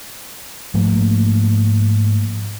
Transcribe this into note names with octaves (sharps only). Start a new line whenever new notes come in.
G#2 F3 A3 A#3